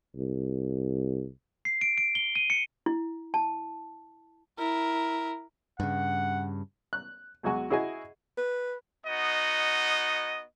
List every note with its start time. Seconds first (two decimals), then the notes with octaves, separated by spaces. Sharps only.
0.16 C2
1.65 C7
1.81 D7
1.98 D7
2.15 G7
2.35 D#7
2.50 C#7
2.86 E4
3.34 A5
4.58 E4 A#4
5.80 G2 C#3 F#5
6.93 F#6
7.43 E2 F#3 G#3 F#4 G#5
7.70 E4 F#4 G#4 D#5 G#5
8.38 B4
9.06 B3 D#4 F#4 D#5